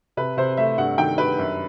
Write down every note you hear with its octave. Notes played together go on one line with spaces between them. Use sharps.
C3 B4
C3 C5
A3 E5
G2 F#5
D#3 G5
G2 B4
F#2